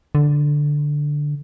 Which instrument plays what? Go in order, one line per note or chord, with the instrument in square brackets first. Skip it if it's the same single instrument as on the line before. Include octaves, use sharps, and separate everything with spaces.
[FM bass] D3